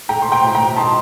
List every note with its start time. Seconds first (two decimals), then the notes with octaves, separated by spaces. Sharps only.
0.09 A3 G5 A#5
0.22 C6
0.31 G5 A#5
0.43 A2
0.55 G5 A#5
0.76 D#4 A5 C6